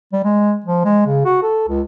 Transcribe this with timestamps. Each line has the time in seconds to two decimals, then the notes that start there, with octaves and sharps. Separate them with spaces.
0.13 G3
0.24 G#3
0.66 F3
0.85 G#3
1.06 C#3
1.25 F#4
1.43 A4
1.68 C#2